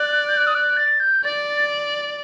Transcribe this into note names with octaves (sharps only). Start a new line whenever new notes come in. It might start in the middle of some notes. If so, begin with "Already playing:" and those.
Already playing: D5 F#6
G6
F#6
D#6
F#6
A6
G6
D5 A6